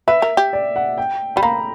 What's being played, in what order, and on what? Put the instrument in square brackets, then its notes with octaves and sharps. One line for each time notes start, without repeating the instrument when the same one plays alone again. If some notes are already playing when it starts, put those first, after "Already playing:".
[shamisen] B4 [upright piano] E5
[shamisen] A#4
G4
[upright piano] D5
F#5
G5
[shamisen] G3 [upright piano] B5
[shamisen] A#3 [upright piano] A#5